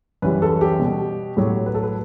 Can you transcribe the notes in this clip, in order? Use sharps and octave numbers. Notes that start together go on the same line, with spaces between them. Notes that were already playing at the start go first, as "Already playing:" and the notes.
F#2 E3 G3 B4
A4
G4
B2 G3
A2 F#3 G4
B4
A4
B4